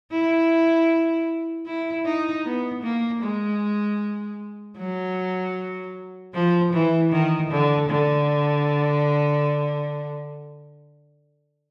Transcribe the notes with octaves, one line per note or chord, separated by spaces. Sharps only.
E4
E4
D#4
B3
A#3
G#3
F#3
F3
E3
D#3
D3
D3